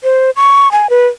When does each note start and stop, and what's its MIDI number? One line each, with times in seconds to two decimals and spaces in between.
0.04 0.30 72
0.36 0.71 85
0.72 0.90 80
0.90 1.07 71